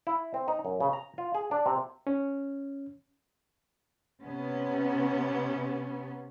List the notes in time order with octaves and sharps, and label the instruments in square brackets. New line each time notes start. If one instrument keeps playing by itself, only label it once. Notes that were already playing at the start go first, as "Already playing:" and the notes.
[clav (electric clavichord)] E4
C4
D#4
F#2
C#3
A#5
F4
G#4
D4
C3
[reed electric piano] C#4
[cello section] C3 B3 C#4